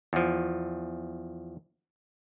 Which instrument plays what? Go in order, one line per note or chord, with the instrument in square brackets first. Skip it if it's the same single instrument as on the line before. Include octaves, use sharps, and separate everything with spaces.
[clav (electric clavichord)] E2 F3